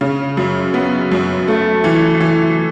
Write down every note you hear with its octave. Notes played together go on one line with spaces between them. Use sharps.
C#3
F#2
B3
F#2
A3
E3
E3